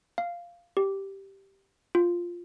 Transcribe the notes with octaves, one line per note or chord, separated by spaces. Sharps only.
F5
G4
F4